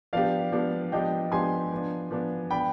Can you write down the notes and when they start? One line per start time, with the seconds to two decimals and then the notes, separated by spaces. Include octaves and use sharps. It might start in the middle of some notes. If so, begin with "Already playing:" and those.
0.13 F3 B3 D4 G4 D5 F5
0.52 F3 B3 D4 G4
0.92 F3 B3 D4 G4 D#5 G5
1.31 F3 B3 D4 G4 G#5 C6
1.72 F3 B3 D4
2.11 F3 B3 D4
2.51 F3 B3 D4 G5 B5